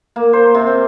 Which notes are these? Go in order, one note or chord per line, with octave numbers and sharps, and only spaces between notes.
A#3
C5
C3
C4